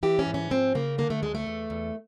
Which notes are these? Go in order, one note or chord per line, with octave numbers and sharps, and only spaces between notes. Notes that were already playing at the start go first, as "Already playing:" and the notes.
E3 G4
C#4
G#2
C#4
F3 C4
C#3 A#3
D3 A#3
A3
D2 G#3
A3
E2
E2